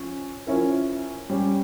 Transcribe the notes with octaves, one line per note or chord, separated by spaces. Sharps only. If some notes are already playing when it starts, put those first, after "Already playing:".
Already playing: F3 C#4
F3 C#4 E4 A#4
G3 C#4 G4